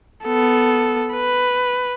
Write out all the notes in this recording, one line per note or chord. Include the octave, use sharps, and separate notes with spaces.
B3 A4
B4